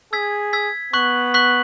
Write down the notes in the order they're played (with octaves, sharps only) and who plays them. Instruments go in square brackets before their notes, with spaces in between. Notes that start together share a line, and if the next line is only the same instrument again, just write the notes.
[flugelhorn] G#4 [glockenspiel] E6 G#6 B6
[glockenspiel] E6 G#6 B6
[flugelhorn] B3 [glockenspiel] C#6 F#6 B6 F#7
[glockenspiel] C#6 F#6 B6 F#7